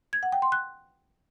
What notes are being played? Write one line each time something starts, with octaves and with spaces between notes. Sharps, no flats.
G#6
F#5
G5
C6
F#6